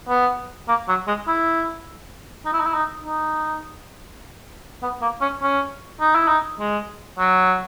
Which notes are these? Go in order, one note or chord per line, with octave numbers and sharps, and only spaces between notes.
B3
A#3
F#3
G#3
E4
D#4
E4
D#4
E4
D#4
D#4
B3
A#3
C#4
C#4
D#4
E4
D#4
G#3
F#3